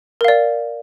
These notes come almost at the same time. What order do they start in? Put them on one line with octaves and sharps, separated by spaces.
A#4 F5 D5